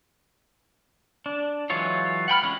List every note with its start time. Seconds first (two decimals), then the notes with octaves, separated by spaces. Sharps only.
1.26 D4
1.70 E3 F#3 G#3 F4 C#5
2.28 F#5 G5 B5 F6
2.43 E3 G#3 C#4 F4 F#4